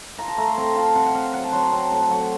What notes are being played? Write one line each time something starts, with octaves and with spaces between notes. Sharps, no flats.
F4 A#5
A5
A3 A#5
C6
C4 A#5
F4 A5
C3 F#5
F#5
C3 F5
F#3 F#5
A5
F#3 C6
A#5
C4 A5
A2 A5
F#3 F#5